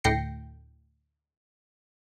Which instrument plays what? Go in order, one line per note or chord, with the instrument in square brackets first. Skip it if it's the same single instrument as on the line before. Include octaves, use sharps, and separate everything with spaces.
[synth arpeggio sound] D2 A2 G5 A#6 C7 C#7